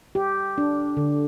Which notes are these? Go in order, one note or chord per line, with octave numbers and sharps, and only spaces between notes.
G4
D4
D3